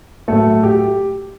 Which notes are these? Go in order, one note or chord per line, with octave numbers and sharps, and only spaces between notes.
A2 F#3 A3 A4
G4